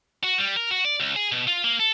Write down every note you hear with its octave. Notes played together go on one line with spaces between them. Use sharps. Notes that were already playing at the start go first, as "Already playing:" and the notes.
F#4
G3
A#4
F#4
D5
C#2
G#4
B2
F4
A#3
A4